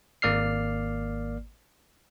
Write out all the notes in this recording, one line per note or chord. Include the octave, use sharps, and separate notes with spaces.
G#1 A#3 D5 F6 C7